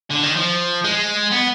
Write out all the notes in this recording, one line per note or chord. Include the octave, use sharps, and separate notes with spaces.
D3
D#3
F3
G#3
B3